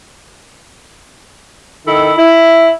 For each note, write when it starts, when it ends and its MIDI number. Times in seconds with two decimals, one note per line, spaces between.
1.87 2.12 51
1.87 2.12 64
1.87 2.12 69
1.87 2.12 75
2.18 2.70 64